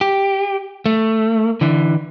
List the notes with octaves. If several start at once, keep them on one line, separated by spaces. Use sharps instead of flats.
G4
A3
D3 E3